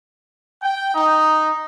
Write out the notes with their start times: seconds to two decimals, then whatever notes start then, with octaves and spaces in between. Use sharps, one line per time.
0.62 G5
0.95 D#4